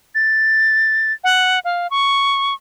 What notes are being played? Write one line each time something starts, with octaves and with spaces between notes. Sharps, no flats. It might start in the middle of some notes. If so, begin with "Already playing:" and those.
A6
F#5
F5
C#6